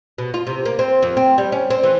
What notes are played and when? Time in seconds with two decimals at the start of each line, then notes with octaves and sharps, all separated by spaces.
0.18 B2
0.34 F4
0.47 C3
0.65 A#3
0.79 C4
1.03 F2
1.17 C4
1.38 G3
1.52 C#4
1.70 C4
1.83 E3